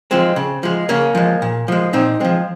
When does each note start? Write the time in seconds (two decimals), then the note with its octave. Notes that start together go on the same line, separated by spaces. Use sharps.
0.11 F3 G#3 C4
0.36 C#3
0.63 F3 G#3
0.89 C#3 A#3 C#4
1.15 F3 G#3
1.42 A#2
1.68 F3 G#3
1.93 A#2 C4 D#4
2.20 F3 G#3 C4